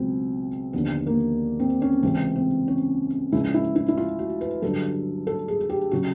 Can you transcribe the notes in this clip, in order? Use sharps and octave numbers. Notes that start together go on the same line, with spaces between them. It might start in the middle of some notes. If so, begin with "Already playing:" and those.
Already playing: C#2 B2 F#3 C4
D#2 D3 F3 B3
A#3
C4
C#4
C#2 C3 E3 C4
C4
C#4
C#2 C#3 F3 E4
E4
E4
E4
F4
F#4
B4
G2 D3 F#3 A4
A4
G#4
G#4
G4
C#3 F#3 F#4